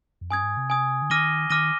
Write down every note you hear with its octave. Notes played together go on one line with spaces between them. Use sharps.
F2
G2 G#5 D#6 G#6
G#2
C3
G#5 D#6 G#6
D3
D#3 D6 F6 A#6 D#7 G7
D#3 D6 F6 A#6 D#7 G7